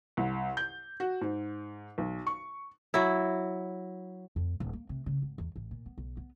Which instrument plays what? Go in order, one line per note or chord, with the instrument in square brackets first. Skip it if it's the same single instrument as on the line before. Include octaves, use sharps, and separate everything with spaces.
[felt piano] C2
G6
F#4
G#2
B1
C#6
[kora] F#3 E4
[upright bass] F2
D#1
A#3
C3
C#3
G#1
E2
A1
A#2
B3
B1
B3